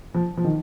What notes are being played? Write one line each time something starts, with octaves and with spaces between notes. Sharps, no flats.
F3
F3
D#3